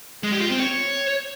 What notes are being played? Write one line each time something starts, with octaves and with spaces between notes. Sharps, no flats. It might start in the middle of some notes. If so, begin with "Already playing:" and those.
G#3
G4
F4
C4
C#5